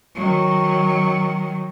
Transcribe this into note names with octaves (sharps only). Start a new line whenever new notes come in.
D#3 F#3